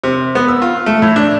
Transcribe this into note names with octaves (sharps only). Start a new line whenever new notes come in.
C3
B3
E6
F4
A3
A2
D4